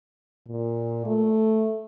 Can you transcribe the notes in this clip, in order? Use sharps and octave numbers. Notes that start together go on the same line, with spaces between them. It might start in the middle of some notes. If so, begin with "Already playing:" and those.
A#2
A3